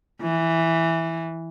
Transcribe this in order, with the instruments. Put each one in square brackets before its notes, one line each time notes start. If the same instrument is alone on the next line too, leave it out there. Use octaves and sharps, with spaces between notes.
[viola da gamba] E3